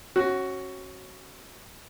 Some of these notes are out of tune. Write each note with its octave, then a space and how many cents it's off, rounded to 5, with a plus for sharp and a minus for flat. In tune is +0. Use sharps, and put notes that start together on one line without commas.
C#4 -25 F#4 +10